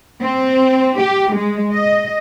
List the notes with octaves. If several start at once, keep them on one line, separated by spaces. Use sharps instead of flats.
C4
G4
G#3
D#5